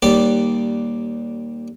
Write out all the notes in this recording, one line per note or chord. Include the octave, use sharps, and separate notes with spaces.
D#2 G3 G4 D5